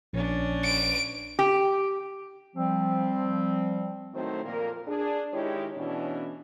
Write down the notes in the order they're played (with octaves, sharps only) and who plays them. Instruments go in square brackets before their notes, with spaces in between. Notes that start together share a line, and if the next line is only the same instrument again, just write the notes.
[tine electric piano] A#1 [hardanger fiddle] C#4 D4
[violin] D7
[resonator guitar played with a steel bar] G4
[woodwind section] F3 G3 C4
[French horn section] A2 D#3 F#3 A3 C4 C5
F2 A#2 A#3 A#4
D4 G#4
D#3 G#3 E4 G4 C#5
E2 B2 E3 C#4 D4